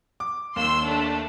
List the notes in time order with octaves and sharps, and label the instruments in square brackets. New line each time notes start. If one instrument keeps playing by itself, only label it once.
[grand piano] D6
[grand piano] D#2 D#3 [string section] C6 E6
[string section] A3 D4